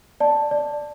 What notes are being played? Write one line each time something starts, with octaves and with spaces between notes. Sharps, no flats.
D5 A5
D5